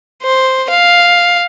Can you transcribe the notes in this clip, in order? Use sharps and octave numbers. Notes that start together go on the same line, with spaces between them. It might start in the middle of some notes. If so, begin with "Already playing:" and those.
C5
F5